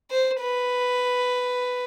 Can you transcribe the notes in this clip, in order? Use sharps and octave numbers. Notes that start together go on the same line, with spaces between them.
C5
B4